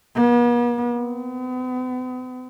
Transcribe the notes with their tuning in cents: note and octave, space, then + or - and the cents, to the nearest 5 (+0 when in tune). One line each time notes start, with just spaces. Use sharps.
B3 -45
B3 +45